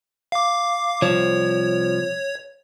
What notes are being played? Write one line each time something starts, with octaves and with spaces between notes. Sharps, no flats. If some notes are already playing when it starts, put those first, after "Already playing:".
F5 D6
C2 F3 C#5